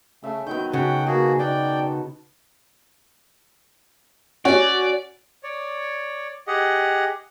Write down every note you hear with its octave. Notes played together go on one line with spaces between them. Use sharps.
C#3 A3 E5
D#3 F#3 B3 G6
C#3 F#4 F#5 G5 A5
B2 A#3 F#4 G#4
D#4 D5 F#5 G5 A5
C#4 F#4 C#5 D5
C#5 D5
G4 G#4 D#5 F#5